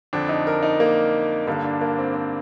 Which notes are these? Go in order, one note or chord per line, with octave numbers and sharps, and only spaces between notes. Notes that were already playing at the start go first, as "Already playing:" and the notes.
F2 D3 D4
D#4
A#4
D#4
A#3
G2 D3 A#3
D4
A#3
C4
C4